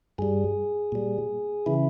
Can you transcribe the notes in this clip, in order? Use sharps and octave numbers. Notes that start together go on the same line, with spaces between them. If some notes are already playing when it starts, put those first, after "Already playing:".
G2 G3 G#4
A#2 G3
C#3 E3 E4